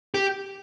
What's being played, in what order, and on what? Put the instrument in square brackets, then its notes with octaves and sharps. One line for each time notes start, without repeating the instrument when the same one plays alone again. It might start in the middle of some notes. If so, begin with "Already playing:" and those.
[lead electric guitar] G4